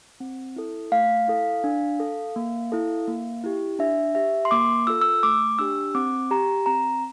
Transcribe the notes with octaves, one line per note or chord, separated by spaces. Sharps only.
C4
E4 A4
A3 F5
E4 A4
D4
A4
A#3
E4 A4
A#3
E4 G4
D4 E5
G4 E5
C6
A#3 D6
F4 A4 E6
E6
A3 D6
D4 G4 E6
C4 D6
G4 A#5
C4 A#5